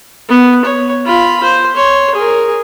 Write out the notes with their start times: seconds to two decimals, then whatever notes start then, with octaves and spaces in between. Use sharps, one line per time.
0.29 B3
0.65 C#5
1.05 F4 B5
1.43 C5
1.76 C#5 C6
2.15 G#4 A#4